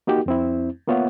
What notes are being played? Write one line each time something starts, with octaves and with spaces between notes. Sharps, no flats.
A#3 D#4 F#4 G4
F2 C4 E4
A#3 B3 F4 C#5 E5 F#5